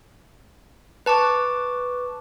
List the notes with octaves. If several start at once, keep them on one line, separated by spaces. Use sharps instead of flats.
B4 A5 C#6 D6